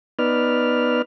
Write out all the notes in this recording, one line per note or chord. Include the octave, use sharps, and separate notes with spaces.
B3 D#4 B4 D5 F6